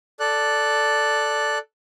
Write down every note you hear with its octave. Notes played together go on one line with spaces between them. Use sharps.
A4 D5 F#6